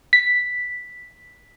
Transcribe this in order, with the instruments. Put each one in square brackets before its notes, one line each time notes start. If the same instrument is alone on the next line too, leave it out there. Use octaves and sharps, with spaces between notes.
[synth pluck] B6